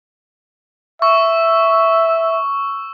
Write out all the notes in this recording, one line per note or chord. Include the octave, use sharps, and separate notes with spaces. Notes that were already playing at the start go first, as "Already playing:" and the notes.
E5 C#6 E6